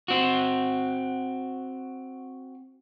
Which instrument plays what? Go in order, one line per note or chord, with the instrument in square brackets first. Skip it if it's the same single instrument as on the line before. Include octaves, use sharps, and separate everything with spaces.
[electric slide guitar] C4 F#4